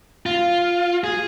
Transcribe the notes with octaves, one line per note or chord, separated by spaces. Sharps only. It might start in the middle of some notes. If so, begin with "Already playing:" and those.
F4
G#4